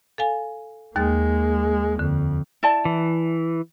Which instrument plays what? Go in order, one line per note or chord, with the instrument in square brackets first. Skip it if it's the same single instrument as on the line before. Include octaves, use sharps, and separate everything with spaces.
[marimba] A4 F5 G#5
[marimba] D#2 A6 [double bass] G#3 A#3
[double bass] F2 [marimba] D3
[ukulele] E4 D5 A5
[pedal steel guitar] E3